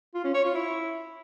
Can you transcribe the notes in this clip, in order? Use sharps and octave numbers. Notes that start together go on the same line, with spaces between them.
F4
C#4
C#5
F4
E4